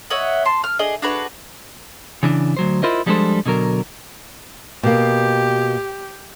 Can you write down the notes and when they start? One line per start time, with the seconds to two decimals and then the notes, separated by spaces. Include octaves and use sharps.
0.10 C#5 D#5 E5 F#5
0.45 A5 C6
0.64 F6
0.79 D4 G#4 D#5
1.02 D4 F#4 G#4 B4
2.23 C#3 E3 D4
2.57 D2 F#3 C5
2.83 E4 F4 A#4 C5 D#5
3.06 F3 G3 G#3 D4 A4 C5
3.46 B2 D3 F#3 A#4
4.83 B2 A#3 G4